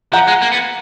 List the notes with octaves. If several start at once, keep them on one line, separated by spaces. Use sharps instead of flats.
F3 F#5 A#5
G#3
A#3
B3